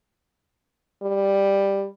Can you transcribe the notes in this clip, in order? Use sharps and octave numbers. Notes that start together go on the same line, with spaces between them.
G3